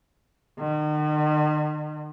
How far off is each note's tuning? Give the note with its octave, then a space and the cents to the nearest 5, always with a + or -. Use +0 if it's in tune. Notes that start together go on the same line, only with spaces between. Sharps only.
D#3 -45